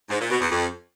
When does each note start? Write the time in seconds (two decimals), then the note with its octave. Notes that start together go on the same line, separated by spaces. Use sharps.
0.10 G#2
0.20 A#2
0.30 B2
0.40 E2
0.51 F2